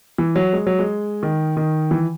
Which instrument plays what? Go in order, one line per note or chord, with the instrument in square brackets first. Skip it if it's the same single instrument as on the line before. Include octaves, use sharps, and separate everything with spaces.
[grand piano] E3
F#3
G#3
F#3
G#3
D#3
D#3
E3